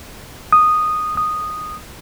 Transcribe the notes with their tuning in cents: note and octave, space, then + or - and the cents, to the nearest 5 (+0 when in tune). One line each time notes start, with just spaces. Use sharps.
D#6 -10
D#6 -10